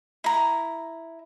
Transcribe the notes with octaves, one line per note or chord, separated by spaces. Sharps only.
E4 A#5